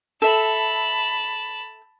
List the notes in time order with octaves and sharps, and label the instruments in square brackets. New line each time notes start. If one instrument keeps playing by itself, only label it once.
[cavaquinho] A4 E5 [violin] A5 B5